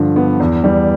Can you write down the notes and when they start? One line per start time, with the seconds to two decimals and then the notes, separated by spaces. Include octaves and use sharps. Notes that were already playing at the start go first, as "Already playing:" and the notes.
Already playing: G2 D3 F3
0.16 B3
0.40 E2
0.64 G3